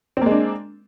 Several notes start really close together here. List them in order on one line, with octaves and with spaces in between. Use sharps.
C4 A#3 G#3 D4